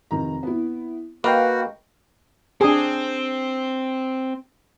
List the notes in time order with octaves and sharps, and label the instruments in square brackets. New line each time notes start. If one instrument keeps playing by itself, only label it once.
[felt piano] F1 D#3 A#5
B3 E4
[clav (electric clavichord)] A#3 [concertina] F#4 [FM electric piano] B4 F5 G5 [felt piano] D#5
[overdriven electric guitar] C4 [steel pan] D4 G#4